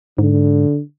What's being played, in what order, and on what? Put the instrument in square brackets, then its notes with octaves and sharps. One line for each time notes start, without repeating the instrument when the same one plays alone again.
[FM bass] G#2 [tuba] D3